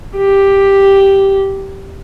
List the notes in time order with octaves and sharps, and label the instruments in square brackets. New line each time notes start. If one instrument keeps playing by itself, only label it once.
[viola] G4